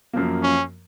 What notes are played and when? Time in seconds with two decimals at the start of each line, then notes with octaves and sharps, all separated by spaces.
0.14 F#2 F3 A#3
0.43 C#4